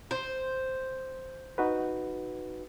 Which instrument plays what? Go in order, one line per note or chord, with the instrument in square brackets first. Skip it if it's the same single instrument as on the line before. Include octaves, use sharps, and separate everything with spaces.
[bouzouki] C5
[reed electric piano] D#4 F#4 B4